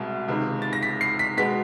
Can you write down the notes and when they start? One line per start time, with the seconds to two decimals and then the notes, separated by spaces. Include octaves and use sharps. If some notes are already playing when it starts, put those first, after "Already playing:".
Already playing: C2 B2 G#3
0.28 C#2 C3 D#3
0.62 A6
0.73 A#6
0.83 B6
1.01 C7
1.19 B6
1.37 B2 G#3 B3 B6